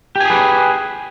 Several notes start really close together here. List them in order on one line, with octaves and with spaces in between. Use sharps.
G4 G#5 G#4 B4